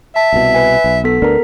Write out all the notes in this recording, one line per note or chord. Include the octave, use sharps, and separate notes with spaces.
E5 A5
C2 B2
B4 G#5
B1
B3 A4 B6
D2 B3 D4 A#4 A#5